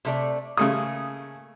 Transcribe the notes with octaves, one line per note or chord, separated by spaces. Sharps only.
C3 A3 D5
C#3 A3 A#3 G#5 D#6